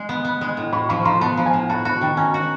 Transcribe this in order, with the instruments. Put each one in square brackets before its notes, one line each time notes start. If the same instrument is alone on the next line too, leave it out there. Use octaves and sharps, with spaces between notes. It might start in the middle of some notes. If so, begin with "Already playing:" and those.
Already playing: [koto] G#3
B3
B3
G#3
A2
[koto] A2 [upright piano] B5 C#6
[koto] F3 [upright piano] B5 C#6
[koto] F3 [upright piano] A#5 C6
[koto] B3 [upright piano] A5 B5
[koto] F3
[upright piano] G#5 A#5
[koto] A2
[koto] F#4 [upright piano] A5 B5
[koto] F#4 [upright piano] A5 B5
[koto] D#3 [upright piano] G5 A5
[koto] C#4 [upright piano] G#5 A#5
[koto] F#4